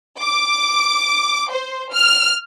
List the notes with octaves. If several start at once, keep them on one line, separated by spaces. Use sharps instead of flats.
D6
C5
F6